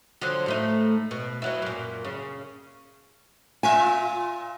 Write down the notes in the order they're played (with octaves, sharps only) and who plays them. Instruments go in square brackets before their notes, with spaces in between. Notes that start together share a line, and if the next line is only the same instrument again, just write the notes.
[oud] D3 F3 F#3
A2 A3 D#4
B2
B2 F#3 E4
F#2 A#2
C#3
[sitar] A#2 F4 E5 [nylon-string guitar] G#5